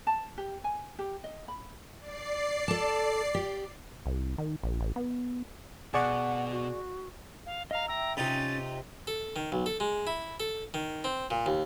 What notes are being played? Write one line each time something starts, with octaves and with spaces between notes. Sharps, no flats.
A5
G4
G#5
G4
D#5
B5
D5 C7
A4 A5
G4
C2
D#3
A#1
A1
B3
B2 G#4 D5 F#5 C#6
F#4
F5
D#5 F5 A#5
E5 G5 A#5 E6
C3 C#4 D#4 F4 A6
A4
D#3
B1
A4
G#3
E4
A4
D#3
C4
A#2
D#2